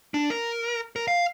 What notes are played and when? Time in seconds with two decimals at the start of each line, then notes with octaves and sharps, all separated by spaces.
0.14 D4
0.30 A#4
0.96 A#4
1.08 F5